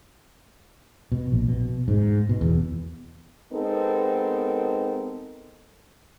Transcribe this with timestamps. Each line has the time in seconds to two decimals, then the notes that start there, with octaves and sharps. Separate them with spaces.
1.12 B2
1.32 A#1
1.48 B2
1.88 G#2
2.29 B2
2.41 E2
3.53 G#3 B3 C4 D#4 A4 A#4